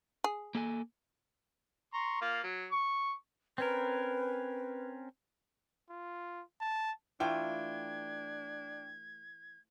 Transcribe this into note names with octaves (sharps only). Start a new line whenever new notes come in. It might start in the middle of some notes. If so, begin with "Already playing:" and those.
G#4
A#3 A4 G#5
A#5 C6 C#6
A#3 F4 F5
F#3
C#6
C4 C#4 A#4 B4
F4
A5
E3 A3 D4 F4 G5 G#6